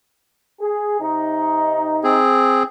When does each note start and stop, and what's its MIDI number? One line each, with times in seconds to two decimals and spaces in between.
0.61 0.98 68
1.01 2.19 48
1.01 2.19 63
2.04 2.63 60
2.04 2.63 68